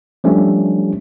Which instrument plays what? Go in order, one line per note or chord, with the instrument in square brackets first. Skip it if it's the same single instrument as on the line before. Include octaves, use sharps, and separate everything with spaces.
[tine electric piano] F3 G3 A3 C#4 D4